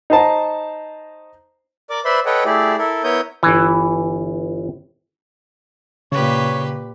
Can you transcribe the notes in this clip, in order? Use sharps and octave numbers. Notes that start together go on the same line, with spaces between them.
D#4 C5 A5 A#5
A#4 D5 D6
B4 C5 D5 E5 B5 C6
A4 B4 C#5 D#5 F#5 G5
A3 E4 G4 G#4 D5
E4 A4 A#4
B3 E4 A#4 C#5 D#6 G6
G1 E3
A#2 C#3 G4 B4 C#5